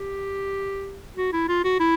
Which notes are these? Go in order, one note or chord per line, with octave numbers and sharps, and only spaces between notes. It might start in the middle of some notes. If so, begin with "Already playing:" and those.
Already playing: G4
F#4
E4
F4
F#4
E4